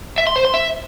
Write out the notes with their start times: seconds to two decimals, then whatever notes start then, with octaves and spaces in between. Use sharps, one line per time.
0.18 E5
0.27 C6
0.36 C5
0.45 C6
0.54 E5